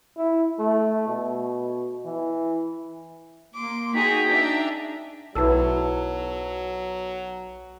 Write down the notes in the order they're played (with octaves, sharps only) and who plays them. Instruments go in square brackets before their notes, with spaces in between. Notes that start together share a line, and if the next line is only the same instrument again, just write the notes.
[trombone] E4
A3
B2
E3
[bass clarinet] A#3 [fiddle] C6 D6
[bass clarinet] D#4 [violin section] F#4 G#4 [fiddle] G5 A#5 [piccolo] B6
[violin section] D4 E5
[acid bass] B1 [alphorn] F#3 [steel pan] E4 A4 [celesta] B4 A5 E6